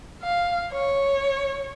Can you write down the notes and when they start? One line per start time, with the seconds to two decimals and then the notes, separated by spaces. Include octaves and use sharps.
0.23 F5
0.72 C#5